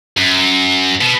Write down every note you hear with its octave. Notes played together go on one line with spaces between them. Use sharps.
F#2
B2